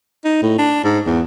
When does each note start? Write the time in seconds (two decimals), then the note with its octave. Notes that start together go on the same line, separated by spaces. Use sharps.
0.25 D#4
0.42 A2
0.59 D4
0.84 G#2
1.06 E2